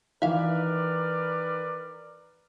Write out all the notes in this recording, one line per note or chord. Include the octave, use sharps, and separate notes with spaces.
D#3 E3 A#4 B4 D5 E5 F5